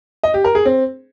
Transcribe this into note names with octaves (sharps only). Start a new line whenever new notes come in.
D#5
G4
A#4
G#4
C4